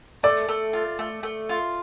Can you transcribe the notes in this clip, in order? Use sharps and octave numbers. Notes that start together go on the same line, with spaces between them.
A3 D5
A3
F4
A3
A3
F4